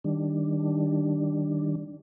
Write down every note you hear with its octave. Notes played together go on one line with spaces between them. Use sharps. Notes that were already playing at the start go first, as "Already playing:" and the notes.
D#3 G3 D4